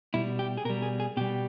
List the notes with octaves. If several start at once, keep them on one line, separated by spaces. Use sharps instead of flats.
B2 G3 E4
G4
G#4
B2 G3 A#4
G#4
G#4
B2 G3 G4